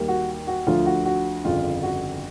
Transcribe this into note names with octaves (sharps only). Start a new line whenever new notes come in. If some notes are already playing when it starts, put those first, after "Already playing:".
Already playing: D#2 D#3 G3 A#3
F#4
F#4
D2 D3 F3 F4
F#4
F#4
G1 F2 C#3 F4
F#4